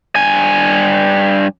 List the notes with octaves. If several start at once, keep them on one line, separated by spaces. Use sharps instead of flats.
G2 G#5